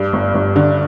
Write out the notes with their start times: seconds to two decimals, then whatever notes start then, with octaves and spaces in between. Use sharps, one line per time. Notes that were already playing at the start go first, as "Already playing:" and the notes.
Already playing: G2
0.13 G1
0.34 G1
0.56 D3